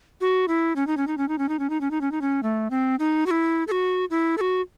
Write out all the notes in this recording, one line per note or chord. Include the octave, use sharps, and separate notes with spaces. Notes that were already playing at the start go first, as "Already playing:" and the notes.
F#4
E4
C#4
D#4
C#4
D#4
C#4
D#4
C#4
D#4
C#4
D#4
C#4
D#4
C#4
D#4
C#4
A3
C4
D#4
F#4
E4
A4
F#4
E4
A4
F#4